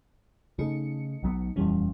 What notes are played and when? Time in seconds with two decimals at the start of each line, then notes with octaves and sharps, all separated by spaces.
0.59 C#3 A3 D#4 C#7
1.23 B1 F#3 B3
1.56 D#1 F2 A#2 E3 G3 C#4